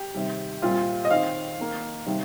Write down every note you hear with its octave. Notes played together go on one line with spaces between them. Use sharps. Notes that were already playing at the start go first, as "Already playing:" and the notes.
Already playing: G4
C3 D#3 G3
A#2 G3 C4 F4
D#5
D#3 C4 F5
D#3 A#3
C3 D#3 G3